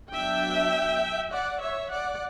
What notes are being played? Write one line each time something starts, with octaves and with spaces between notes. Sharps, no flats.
F#3 B3 D4 E5 G5
D5 F#5
C#5 E5
D5 F#5